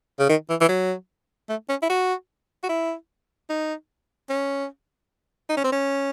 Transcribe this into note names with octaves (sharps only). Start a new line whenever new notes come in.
C#3
D#3
E3
E3
F#3
A3
C#4
E4
F#4
F#4
E4
D#4
C#4
D#4
C#4
C4
C#4